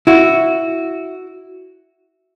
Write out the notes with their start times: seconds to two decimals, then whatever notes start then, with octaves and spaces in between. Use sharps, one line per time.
0.07 E4 F#4